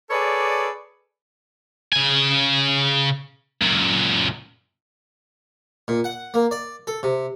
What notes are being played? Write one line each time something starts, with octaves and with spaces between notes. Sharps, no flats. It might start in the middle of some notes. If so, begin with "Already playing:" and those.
G#4 A4 B4 C#5 D5
C#3 G#5
F#2 A#2
A#2
F#5
A#3
D5
A4
C3